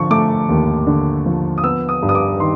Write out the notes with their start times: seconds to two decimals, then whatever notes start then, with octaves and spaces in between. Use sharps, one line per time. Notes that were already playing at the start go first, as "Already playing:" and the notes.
Already playing: D3 F3 C#6
0.10 A3 D6
0.49 D#2
0.87 D3
1.26 F3
1.58 D#6
1.64 B3 E6
1.89 D#6
2.03 G2
2.09 D#6
2.15 D6
2.40 D#3 C6